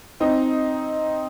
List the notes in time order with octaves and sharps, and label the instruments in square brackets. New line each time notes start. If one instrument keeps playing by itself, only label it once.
[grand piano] C4 D#4